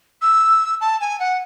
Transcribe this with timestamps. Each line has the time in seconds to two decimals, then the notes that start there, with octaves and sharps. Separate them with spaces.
0.22 E6
0.80 A5
1.00 G#5
1.19 F#5